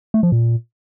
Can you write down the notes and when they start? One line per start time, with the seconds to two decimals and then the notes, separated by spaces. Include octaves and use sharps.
0.14 A3
0.23 F3
0.32 A#2